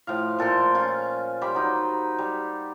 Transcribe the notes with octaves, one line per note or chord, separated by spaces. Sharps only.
A2 F3 F5
A#2 A4 G5 C6
C#4 F4 G#5
G3 C5 B5 D6
F#3 D#4
G3